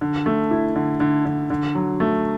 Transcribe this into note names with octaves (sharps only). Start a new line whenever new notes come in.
D3
A3
E4
D3
D3
D3
D3
F#3
A3